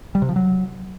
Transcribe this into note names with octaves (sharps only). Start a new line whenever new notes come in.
G3
C3
F3
F#3